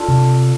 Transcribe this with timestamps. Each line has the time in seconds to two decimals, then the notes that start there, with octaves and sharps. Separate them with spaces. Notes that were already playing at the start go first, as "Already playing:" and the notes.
Already playing: D4 F4 A4
0.08 C3